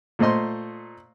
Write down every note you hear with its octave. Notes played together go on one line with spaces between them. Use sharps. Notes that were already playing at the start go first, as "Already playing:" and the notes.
A#2 A3 C5 D#5 C6